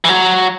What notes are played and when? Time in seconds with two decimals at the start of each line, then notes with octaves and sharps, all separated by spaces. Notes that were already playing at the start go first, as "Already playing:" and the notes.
0.05 E3
0.09 F#3